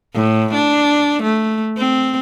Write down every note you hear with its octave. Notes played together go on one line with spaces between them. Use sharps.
A2
D4
A3
C4